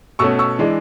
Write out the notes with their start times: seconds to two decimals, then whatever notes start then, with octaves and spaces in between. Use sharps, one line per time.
0.19 B2 A3 C#4 C#6 E6
0.39 C#6 E6
0.59 E3 G#3 D4